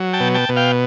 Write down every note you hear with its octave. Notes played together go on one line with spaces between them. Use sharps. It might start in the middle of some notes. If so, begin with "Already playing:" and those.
Already playing: F#3
G5 A5
B2
G5 A5
B2
F5 G5